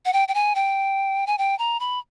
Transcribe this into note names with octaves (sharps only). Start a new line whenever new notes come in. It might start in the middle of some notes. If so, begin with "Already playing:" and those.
F#5
G5
G5
G#5
G5
G#5
G5
A#5
B5